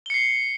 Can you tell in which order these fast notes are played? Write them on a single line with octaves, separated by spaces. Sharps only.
G7 C#7 C7